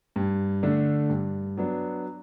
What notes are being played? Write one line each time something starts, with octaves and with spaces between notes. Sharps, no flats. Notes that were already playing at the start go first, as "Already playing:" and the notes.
G2
D3 A3 D4
G2
F#3 B3 D4